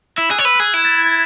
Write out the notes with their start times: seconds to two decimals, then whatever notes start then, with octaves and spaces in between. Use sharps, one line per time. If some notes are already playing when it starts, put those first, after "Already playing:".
0.17 E4 E6
0.31 G#4 F#6
0.39 C#5
0.45 B4 E6
0.55 F#6
0.59 G#4 G#6
0.74 E4
0.85 A6
0.95 G#6
1.06 A6